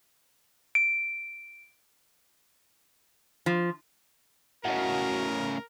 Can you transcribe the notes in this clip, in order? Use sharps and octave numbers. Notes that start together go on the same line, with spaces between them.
D7
F3
A2 C#3 F#4 A#4 D#5 F#5